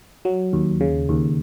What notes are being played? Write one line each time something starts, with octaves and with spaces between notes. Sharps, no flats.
F#3
D#2
C#3
D#2